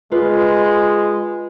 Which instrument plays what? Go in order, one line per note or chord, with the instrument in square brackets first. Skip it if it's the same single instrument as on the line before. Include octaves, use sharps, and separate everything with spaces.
[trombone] G#3 [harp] F4 B4